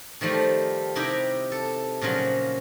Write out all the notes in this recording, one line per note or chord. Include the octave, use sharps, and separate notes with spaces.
D#3 F3 G3 A3
C3 D#4 E4 G4 G5 A#5
A4
A#2 C#3 F3 F#3 C#4